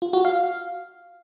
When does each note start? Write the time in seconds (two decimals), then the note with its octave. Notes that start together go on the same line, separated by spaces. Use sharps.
0.02 F4
0.13 F#4
0.25 F5